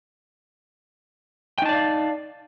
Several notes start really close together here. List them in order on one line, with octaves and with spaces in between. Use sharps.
G5 D#4 A5 D5 F5